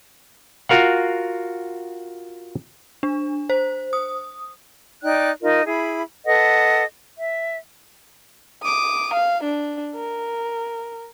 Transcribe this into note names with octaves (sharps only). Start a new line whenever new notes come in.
F4 F#4 A#4 F5 F#5
D4
C5
D#6
D#4 D5 G5 F#6
D#4 F4 A#4 D#5
E4 G#4 B5
A4 B4 D#5 F#5
E5
D6 D#6
F5
D4
A#4